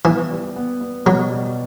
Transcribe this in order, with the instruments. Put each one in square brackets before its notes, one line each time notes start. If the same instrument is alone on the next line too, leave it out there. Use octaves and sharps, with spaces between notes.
[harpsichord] E3 [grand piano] B3
[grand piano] G3
B3
B3
[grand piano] B2 [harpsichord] F#3
[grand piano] G3